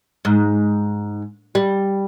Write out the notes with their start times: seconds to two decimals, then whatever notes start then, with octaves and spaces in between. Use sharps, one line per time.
0.25 G#2
1.55 G3